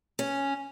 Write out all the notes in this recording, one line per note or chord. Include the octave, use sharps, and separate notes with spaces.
C#4